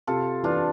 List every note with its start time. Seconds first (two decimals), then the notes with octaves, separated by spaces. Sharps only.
0.07 C3 F4 A4
0.43 E3 D4 F4